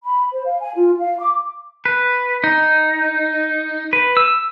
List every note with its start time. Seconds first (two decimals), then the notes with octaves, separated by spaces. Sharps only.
0.04 B5
0.32 C5
0.45 F5
0.61 G#5
0.76 F4
0.99 F5
1.19 D6
1.85 B4
2.44 D#4
3.93 B4
4.17 E6